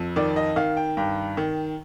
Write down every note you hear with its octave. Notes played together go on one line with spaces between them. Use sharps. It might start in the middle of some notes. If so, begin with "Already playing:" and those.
Already playing: F2
D#3 D5
D#5
D#3 F5
G5
G2 G5
D#3